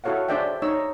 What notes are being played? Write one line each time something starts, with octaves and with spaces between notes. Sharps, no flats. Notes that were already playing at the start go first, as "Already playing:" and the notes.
E4 F#4 A4 C#5 F5 F#5
D4 G#4 C5 D5 E5 G5
D#4 C#5 E6